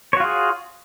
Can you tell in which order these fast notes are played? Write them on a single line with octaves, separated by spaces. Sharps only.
C#5 F#4 F4 G#4